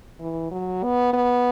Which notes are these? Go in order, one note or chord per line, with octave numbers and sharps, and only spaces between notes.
E3
F#3
B3
B3